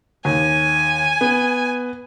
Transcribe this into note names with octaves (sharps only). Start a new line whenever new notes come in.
D#2 G#5
B3